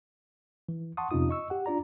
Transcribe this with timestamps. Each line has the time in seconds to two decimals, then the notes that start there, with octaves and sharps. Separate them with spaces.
0.69 E3
0.97 F#5 A5 C6 C#6 D#6
1.11 F2 C3 C#4 D#4 F4 D#6
1.29 D#5 C#6 E6
1.50 G4 F#5
1.66 D4 F4 D5 A#5